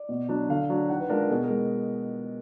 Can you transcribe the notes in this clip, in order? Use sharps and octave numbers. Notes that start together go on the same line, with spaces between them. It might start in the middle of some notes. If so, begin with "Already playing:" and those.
Already playing: D5
B2
F#3 D4
D3 F5
F#3 D4
D#3 F#5
B4
G#3 D4 F4 A#4
A#4
B2 G#4
A#4
G#3